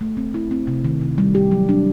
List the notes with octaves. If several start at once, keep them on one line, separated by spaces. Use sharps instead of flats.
A3
C4
E4
C4
C3
D#3
C3
G3
G4
F#3
D4